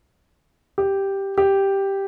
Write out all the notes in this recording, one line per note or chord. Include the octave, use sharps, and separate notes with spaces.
G4
G4